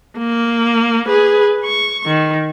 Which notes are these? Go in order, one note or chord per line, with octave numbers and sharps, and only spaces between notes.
A#3
G#4 B4
C#6
D#3